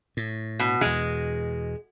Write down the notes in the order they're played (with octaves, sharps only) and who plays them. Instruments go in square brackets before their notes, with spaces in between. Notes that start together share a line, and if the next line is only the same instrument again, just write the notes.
[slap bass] A2
[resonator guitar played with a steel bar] B2
[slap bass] E2 B2 [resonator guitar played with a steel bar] G#3